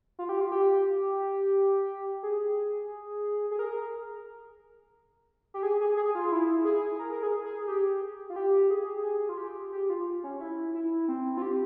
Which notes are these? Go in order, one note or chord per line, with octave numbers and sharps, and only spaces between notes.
F4
G4
F4
G4
G#4
G#4
A#4
G4
G#4
G#4
G#4
F4
E4
G#4
A#4
A#4
G#4
G#4
G4
F4
G4
G#4
G#4
F4
G4
G4
F4
C#4
E4
E4
C4
F4
G4